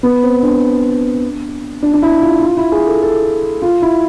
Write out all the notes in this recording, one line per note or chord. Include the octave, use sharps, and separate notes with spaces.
B3
C4
D4
D4
D4
E4
F4
F4
E4
G#4
A4
A4
F4
E4